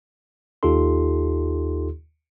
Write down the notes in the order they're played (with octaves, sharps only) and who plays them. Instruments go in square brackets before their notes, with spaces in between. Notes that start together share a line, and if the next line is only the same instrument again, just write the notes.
[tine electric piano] D#2 D#4 F4 G4 A4 C6